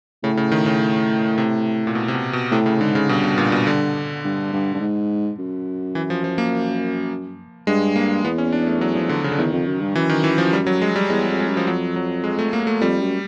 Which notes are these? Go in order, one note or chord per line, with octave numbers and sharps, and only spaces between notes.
A2 C#3
C#3
D#3
C#3
C3
A#2
B2
C3
B2
B2
A2 C3
C#3
G#2 D3
C#3
G2 B2
B2
A#2
B2
D3
G2
G2
G2
G#2
F#2
E3
F3
F3
A#3
G2 G#3
A#3
E2 B3
C#4
D4
A3
F#3
F3
D3
C#3
D3
E2 D#3
F2
F#2
G2
F#2 E3
D#3
E3
F3
G3
F#3
G#3
G3
E2 G#3
F2
G#3
F#2
F3
F2 F#3
F#3
G#3
A3
A#3
A3
F2 G3
F#2